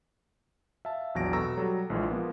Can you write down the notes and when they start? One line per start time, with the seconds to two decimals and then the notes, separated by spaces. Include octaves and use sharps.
0.85 E5 F5 A5
1.15 A#1 E2 F#3 A#6 D7
1.33 B2 A4 A#5 C#6 E6 A#6
1.57 F#3 G3 A4
1.90 A#1 E3 G#3 F4
2.11 F3 A#3 B3